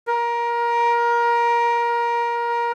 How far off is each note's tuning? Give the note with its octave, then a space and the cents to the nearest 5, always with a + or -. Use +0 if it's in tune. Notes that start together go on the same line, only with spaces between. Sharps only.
A#4 +20